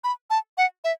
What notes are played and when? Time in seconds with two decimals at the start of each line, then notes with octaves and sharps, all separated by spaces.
0.04 B5
0.30 A5
0.58 F#5
0.84 E5